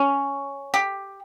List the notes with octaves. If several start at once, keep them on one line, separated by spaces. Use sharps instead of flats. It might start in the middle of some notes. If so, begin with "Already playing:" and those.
Already playing: C#4
G4